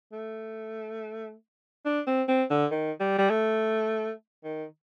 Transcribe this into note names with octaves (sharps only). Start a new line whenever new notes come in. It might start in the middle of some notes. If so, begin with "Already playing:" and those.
A3
D4
C4
C4
D3
D#3
G3
G3
A3
D#3